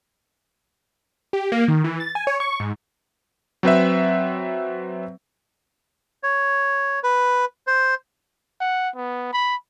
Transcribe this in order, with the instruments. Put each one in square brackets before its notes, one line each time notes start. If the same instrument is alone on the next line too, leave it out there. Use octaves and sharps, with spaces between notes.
[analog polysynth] G4
A#3
D#3
E3
A6
G#5
C#5
C#6
G#2
[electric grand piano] F#3 C4 B4 E5
[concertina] C#5
B4
C5
[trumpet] F#5
B3
B5